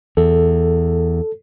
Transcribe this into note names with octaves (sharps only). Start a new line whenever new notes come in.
E2 A4